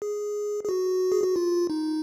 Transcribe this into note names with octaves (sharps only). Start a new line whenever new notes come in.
G#4
G#4
F#4
G#4
F#4
F4
D#4